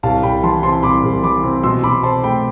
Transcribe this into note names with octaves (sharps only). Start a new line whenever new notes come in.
C2 F5 A5
C2 G5 B5
E3 A5 C6
C3 A5 C6
C2 B5 D6
C2
E3 B5 D6
C3
B2 C6 E6
B2 B5 D6
C4 A5 C6
A3 G5 B5